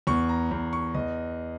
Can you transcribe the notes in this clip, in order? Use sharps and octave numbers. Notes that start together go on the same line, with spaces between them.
E2 C#6
A#5
E2
C#6
E2 D#5